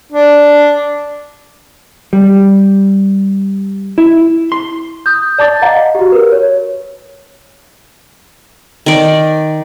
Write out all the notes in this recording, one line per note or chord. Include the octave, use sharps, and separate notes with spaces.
D4
G3
E4
C6
D#6 G6
D5 A5 D6 A6
D#5 F5 F#5 A#5
F#4 G4
A#4 B4
C#5
D#3 D5